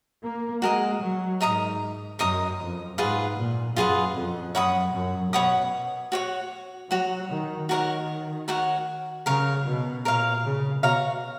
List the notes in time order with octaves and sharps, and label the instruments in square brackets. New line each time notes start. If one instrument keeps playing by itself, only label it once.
[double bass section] A#3
[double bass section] G#3 [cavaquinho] F#4 A#4 D#5
[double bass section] F#3
[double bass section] G#2 [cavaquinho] A#4 D#5 A#5 D#6
[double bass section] F#2 [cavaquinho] A#4 D#5 A#5 D#6
[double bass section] F2
[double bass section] G#2 [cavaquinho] F4 G#4 B4 F#5
[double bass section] A#2
[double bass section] F#2 [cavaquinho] F4 G#4 B4 F#5
[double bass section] F2
[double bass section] F#2 [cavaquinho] C#5 F#5 B5 D#6
[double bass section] F#2
[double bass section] B2 [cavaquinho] C#5 F#5 B5 D#6
[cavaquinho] F#4 C#5 F#5
[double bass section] F#3 [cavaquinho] F#4 C#5 F#5
[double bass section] D#3
[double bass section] D#3 [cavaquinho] F#4 A#4 C#5 F#5
[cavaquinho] F#4 A#4 C#5 F#5
[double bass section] C#3 [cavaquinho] A#4 C#5 F5
[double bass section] B2
[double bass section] A#2 [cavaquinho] A#4 C#5 F5
[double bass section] C#3
[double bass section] B2 [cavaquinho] F#4 C#5 F5 A#5